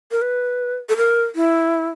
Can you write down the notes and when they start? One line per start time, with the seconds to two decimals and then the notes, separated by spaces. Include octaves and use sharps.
0.12 A#4
0.22 B4
0.89 A4
0.97 A#4
1.35 E4